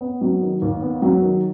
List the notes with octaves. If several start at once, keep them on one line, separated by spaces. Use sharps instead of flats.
B3
F#3
D#3
D#2
B3
F#3
D#3